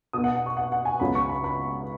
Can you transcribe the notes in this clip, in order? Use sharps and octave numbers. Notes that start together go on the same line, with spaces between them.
B2 B3 D#6
F#5
F#5
C#6
F#5
F#5
G#5
C#2 C#3 F#3 B3 B5
C#6
B5
B5